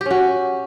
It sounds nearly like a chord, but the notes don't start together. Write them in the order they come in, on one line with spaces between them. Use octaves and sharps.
G4 C#4 F#4